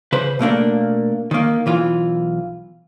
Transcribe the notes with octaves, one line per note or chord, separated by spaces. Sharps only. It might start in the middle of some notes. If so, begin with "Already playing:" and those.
C#3 B4 C5
B2 A3 A#3 D4
D#3 A#3
B1 E3 F4